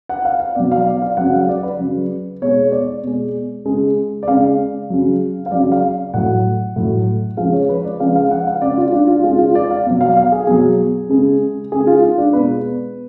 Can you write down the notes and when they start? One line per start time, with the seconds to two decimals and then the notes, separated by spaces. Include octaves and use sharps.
0.09 F#5
0.25 F5
0.40 F5
0.55 B2 F#3 D5
0.71 F5
0.86 D5
1.02 F5
1.17 C#3 F#3 F#5
1.33 F5
1.49 D5
1.63 B4
1.79 C#3 F#3
2.42 B2 G#3 C#5
2.72 D5
3.03 B2 G#3
3.65 C#3 G#3
4.23 D5
4.28 C#3 G#3 F5
4.90 C#3 F#3
5.46 F5
5.52 C#3 F#3 D5
5.72 F5
6.14 A2 F#3 F#5
6.76 A2 F#3
7.37 C#3 F3 G#3 F5
7.53 C#5
7.69 B4
7.85 D5
8.00 C#3 F3 G#3 F5
8.16 F5
8.31 F#5
8.47 F5
8.61 C#3 G#3 D5
8.78 F4
8.93 D4
9.08 F4
9.23 C#3 G#3 F4
9.39 F4
9.55 D5
9.71 F5
9.86 B2 F#3
10.01 F5
10.17 F5
10.32 G#4
10.47 B2 F#3 G#4
11.09 C#3 G#3
11.72 C#3 G#3 G#4
11.87 F4
12.03 F4
12.18 D4
12.33 B2 G#3 B4